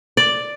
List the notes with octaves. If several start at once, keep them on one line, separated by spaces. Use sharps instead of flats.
D5